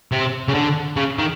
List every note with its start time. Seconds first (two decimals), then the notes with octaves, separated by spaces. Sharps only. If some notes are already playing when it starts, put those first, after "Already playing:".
0.12 C3
0.48 C#3
0.54 D3
0.97 C#3
1.19 D#3